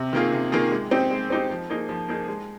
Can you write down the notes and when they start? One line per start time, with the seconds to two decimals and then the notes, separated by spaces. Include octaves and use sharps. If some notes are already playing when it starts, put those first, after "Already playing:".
Already playing: C3
0.13 D#3 A#3 F4 G#4
0.32 C3
0.52 D#3 A#3 F4 G#4
0.71 G#3
0.91 C4 D#4 G4
1.11 G#3
1.30 C4 D#4 G4
1.50 F3
1.70 A#3 D#4 G#4
1.89 F3
2.09 A#3 D#4 G#4
2.28 G#3